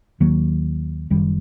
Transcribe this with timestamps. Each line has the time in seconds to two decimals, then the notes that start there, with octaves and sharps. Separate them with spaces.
0.20 D#2 D#3 F#3 A#3
1.10 F#1 F#2 D#3 G3